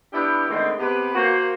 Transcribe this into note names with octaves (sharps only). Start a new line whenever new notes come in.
B3 D4 E4 G4
D3 D#3 G#3 A3 B3 C4
C3 B3 G4 B4
A#3 F#4 C5